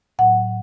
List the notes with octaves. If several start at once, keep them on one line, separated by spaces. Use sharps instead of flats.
A2 F#3 F#5